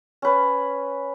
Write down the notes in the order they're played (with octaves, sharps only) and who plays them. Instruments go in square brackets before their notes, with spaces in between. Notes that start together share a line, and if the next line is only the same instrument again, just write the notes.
[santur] C#4 B4